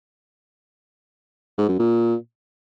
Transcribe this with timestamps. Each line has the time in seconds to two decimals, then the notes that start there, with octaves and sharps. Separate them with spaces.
1.58 G#2
1.68 F#2
1.79 A#2